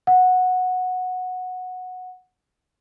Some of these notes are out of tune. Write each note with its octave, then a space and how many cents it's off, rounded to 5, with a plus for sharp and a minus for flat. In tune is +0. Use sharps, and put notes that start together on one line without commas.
F#5 -10